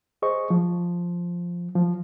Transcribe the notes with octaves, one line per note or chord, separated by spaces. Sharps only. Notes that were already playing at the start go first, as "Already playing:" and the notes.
G#4 C5 D#5 C#6
F3
F3